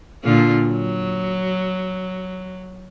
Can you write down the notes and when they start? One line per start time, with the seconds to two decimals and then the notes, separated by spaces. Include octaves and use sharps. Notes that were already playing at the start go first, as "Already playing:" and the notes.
0.24 A#2 D3 F4
0.67 F#3